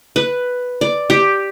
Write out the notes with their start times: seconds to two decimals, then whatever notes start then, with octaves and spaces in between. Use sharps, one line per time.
0.16 B4
0.81 D5
1.10 G4